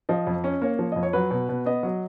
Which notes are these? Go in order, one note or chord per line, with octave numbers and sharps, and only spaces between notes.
F3 D#5
F2
C#4
A#3 C#5
F3
F2 D#5
C#5
F#3 B4
B2
B2
B3 D#5
F#3